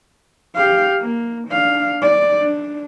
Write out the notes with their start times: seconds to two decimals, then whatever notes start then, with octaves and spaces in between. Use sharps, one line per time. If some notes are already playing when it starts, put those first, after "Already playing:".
0.55 G4 F5
1.01 A#3
1.48 D4 F5
2.02 D5
2.41 D4